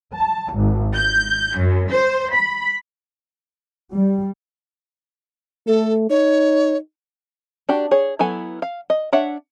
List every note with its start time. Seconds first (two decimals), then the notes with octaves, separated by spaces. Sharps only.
0.16 A5
0.56 G#1
0.95 G6
1.59 F#2
1.90 C5
2.34 B5
3.93 G3
5.67 A3 A4
6.10 D#4 C#5
7.69 D4 F#4 G4
7.91 G#4 C#5
8.19 F#3 B3 E4 A4 G#5
8.62 F5
8.90 D#5
9.13 D4 C#5 E5 F#5